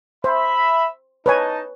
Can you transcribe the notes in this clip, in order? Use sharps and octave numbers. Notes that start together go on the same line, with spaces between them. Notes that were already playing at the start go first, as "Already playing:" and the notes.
C5 E5 B5
D#4 B4 C#5 D#5 G#5 A5